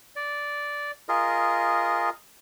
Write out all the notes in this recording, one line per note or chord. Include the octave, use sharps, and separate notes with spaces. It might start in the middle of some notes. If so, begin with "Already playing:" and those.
D5
F4 G#4 A#4 D#5